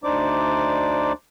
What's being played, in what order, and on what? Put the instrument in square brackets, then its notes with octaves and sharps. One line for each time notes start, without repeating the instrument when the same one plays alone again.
[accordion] D2 D4 D#4 C5 D5 D6